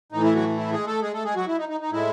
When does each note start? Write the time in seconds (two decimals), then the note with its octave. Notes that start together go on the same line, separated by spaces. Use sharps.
0.12 A2 E3 A3 D#4
0.23 E4
0.35 F#3 F#4
0.57 E4
0.72 G#3 G#4
0.87 A3 A4
1.02 G#3 G#4
1.13 A3 A4
1.25 G#3 G#4
1.35 F#3 F#4
1.47 E4
1.58 D#4
1.69 D#4
1.81 D#4
1.91 A2 G#3 E4